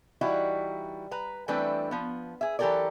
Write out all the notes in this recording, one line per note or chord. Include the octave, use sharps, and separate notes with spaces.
E3 G3 D#4 E4 F#4
B4 A#5
E3 G3 A3 C4 D4 B4
F3 B3
G#4 E5
E3 F#3 G4 A4 A#4 D5